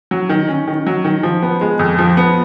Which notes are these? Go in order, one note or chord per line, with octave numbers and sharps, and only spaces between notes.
F#3
D#3
C#4
D#3
F#3
D#3
F3
B3
G#3
F2
F3
B3